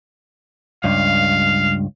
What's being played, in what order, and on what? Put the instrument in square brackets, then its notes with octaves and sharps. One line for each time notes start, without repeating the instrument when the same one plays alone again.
[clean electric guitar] C#2 G2 [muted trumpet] F5